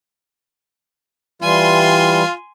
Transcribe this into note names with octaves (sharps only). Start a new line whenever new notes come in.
E3 G3 F4 G#5 C6